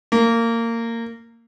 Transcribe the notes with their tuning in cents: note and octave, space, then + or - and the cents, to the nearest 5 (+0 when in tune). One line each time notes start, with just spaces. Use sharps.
A#3 -20